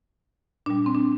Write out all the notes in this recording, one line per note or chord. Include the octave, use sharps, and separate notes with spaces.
A#2 G3 D4
C4
D4